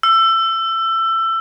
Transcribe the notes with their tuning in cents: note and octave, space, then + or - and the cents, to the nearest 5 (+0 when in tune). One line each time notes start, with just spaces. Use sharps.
E6 +20